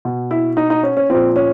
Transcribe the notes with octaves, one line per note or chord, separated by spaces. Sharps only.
B2
E4
D#4
D#4
C#4
C#4
A#2 F3 C4
C#4